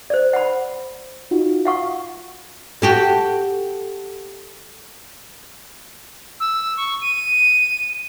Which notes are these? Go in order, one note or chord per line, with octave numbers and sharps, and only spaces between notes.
C5 D5
F#5 B5
D#4 F4 F#4
F5 F#5 C#6
F#4 G4 A4
E6
C#6
D#7